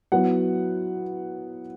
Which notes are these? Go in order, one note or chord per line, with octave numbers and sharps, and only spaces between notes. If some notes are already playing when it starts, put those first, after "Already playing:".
F#3 B3 E4 F#5